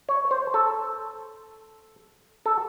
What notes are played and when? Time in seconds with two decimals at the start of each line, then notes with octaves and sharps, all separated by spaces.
0.09 C#5
0.31 C5
0.54 A4
2.46 A4